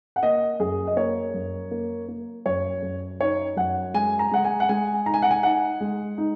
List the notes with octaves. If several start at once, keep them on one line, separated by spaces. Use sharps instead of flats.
F#5
A#3 D#5
F#2 G#4
D#5
A#3 C#5
F#2
A#3
A#3
F#2 C#5
F#2
D#4 C#5
F#2 F#5
G#3 G#5
A#5
G#3 F#5
G#5
F#5
G#3 G#5
D#4 A#5
G#5
F#5
G#5
D#4 F#5
G#3
D#4